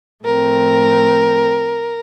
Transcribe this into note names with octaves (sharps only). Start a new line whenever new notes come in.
A2 F3 A3 C4 A#4